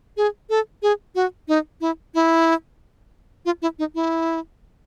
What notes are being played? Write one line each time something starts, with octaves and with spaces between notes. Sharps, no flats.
G#4
A4
G#4
F#4
D#4
E4
E4
F4
E4
D#4
E4